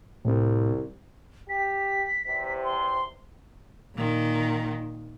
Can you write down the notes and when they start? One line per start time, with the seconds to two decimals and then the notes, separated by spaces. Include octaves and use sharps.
0.25 C2 A2 C4
1.49 G4 B6
2.27 E2 C3
2.64 C6
3.96 A#2 D#3